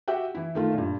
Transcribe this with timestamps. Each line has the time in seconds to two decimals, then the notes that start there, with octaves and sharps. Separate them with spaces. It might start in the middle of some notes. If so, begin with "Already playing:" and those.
0.08 F#4 G4 E5 F#5 G5
0.35 E3 E4
0.55 D#3 A3 F4
0.74 G2 A#2